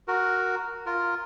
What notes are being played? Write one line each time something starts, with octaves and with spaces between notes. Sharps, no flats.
F#4 A#4
F4 A#4